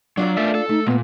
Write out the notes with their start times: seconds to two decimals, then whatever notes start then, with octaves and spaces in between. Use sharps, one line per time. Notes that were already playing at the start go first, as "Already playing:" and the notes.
0.17 F#3 D4 F4 D5
0.37 A3 A4 A#4 E5
0.55 A4
0.69 A3 D#4
0.87 A#2 G#3 A#3 B3